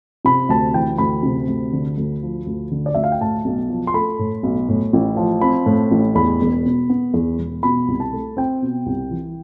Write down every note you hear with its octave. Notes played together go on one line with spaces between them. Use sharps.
C3 B5
D2 A5
E3 G5
D2 B5
C3
D2
D3
D2
F3
D2
D3
D5
D2 E5
F5
G5
A2 A5
B1
F3
C6
A3 B5
A2
B1
A2
A1
F3
C4 B5
A2
A1
E2 B5
E1
B2
B3
E2
E1
B2 B5
C2
A5
A3
C4 G5
B2
C2
E3